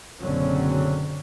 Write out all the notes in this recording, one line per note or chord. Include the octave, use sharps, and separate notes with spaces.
F#1 B1 D3 F#3 C4 C#4